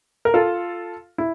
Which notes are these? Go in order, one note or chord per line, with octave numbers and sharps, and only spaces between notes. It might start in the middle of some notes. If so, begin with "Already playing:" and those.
A#4
F4 A4
E4